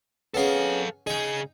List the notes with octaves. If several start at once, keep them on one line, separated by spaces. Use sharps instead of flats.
B3 C#4 G#4 A4 F5
C#3 D#4 G#4 G5